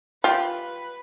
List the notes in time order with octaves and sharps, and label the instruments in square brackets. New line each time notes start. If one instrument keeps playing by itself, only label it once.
[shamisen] F4 G4 [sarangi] B4